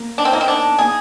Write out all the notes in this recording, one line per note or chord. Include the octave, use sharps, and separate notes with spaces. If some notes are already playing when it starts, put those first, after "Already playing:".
Already playing: A#3
D4
C4
A#3 D#4 A#4 D#5
C4
D4
A#3 G#4